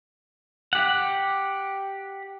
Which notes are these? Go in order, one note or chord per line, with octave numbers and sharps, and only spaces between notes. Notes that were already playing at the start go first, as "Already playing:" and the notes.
G4 F#5